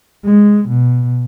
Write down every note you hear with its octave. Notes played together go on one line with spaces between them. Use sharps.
G#3
B2